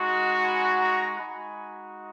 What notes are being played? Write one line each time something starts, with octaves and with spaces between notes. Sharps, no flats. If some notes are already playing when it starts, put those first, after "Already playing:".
Already playing: G#3 D#4 F#4
G#5 B5
A#5 C#6
G#3 D#4 F#4 G#5 B5